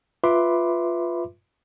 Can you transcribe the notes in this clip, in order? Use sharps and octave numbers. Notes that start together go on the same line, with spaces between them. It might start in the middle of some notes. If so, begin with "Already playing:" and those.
F4 B4 E5 B5 C6 D6